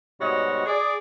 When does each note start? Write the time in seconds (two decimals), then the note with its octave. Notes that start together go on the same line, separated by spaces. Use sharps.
0.20 G#2 B2 G3 F#4 C#5 D#5
0.66 G#4 D5